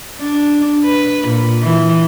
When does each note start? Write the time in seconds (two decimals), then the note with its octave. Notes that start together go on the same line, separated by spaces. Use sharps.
0.20 D4
0.85 B4
1.28 A#2
1.62 E3